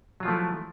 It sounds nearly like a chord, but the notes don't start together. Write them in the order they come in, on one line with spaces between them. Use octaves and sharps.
F#3 F4 F3 A3 E4